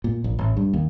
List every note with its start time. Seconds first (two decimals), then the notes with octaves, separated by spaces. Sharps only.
0.04 A#2
0.24 A#1
0.39 A1
0.57 G2
0.74 D#2